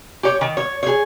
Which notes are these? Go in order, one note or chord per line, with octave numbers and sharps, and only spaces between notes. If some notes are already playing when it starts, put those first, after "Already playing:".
G4 C#5
D#3
C#5
G#4 C#5